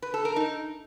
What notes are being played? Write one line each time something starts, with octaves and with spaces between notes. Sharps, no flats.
B4
A4
A#4
D#4